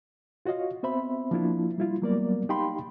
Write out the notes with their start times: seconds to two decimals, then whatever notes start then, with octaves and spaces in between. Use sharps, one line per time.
0.46 F4 F#4 C#5 D#5 F5
0.83 B3 C4 C5 E5 B5
1.31 F3 A#3 D4 E4 F4
1.78 G3 E4 F4
2.02 F#3 G3 A#3 B3 A#4 D5
2.49 D#4 G4 F5 G5 B5 C6